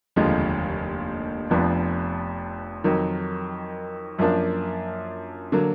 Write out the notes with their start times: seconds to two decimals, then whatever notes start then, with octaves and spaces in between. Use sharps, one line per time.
0.16 F1 D#2 D3 F3 G#3
1.50 F1 F2 F3 B3 D4
2.84 F2 D#3 F#3
4.18 F#2 F3 A#3 D4
5.52 D3 F#3 A#3